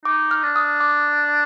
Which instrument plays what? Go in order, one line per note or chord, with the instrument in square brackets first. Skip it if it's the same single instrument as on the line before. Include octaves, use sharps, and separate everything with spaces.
[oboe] D#4 [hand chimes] D6
[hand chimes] F6
[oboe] D4 [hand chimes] F6
[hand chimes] D#6
D6